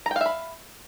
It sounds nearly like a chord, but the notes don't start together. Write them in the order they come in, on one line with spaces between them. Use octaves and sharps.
A#5 G5 F5 E5 B5